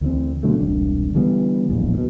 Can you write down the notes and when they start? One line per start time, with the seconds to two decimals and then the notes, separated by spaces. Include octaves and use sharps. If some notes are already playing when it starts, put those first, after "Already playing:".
0.01 D2 E3 G3 C4
0.43 B2 D3 F#3 A3
0.60 E1 C2 D4
1.14 D3 E3 G3 B3
1.69 D1 A#1 E2
1.94 G#2 B2